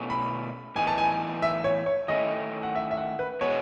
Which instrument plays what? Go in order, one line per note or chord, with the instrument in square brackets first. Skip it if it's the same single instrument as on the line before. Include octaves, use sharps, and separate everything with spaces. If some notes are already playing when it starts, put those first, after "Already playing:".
Already playing: [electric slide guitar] B2 A3 C#4 E4
[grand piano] B5
[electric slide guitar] A2 E3 B3 D#4 [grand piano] G#5
[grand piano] A5
G#5
E5
C#5
C#5
[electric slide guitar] D#3 A3 C#4 E4 [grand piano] D#5
[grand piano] F#5
E5
E5
F#5
B4
[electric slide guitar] B2 G#3 B3 [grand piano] C#5